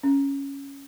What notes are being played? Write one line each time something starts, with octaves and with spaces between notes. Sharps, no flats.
C#4